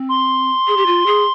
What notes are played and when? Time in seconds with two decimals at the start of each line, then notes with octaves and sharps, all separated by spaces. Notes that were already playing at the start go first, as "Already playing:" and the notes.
Already playing: C4
0.09 C6
0.68 G#4
0.77 G4
0.86 F4
1.06 G#4